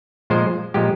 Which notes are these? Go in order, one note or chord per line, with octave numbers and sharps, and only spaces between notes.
A#2 F3 G#3 C5
A#2 F3 G#3 G4